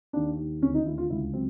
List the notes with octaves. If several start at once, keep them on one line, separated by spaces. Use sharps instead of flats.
D#2 D4
D#2
D2 C#4
D#4
D2 E4
F4
C#2 E4
F#3 C4